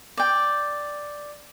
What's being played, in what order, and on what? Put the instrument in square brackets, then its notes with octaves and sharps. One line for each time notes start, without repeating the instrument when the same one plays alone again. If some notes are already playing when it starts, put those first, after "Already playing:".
[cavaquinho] D5 G5